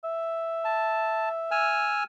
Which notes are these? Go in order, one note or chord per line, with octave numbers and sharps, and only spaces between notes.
E5
A5
G#5 E6 F6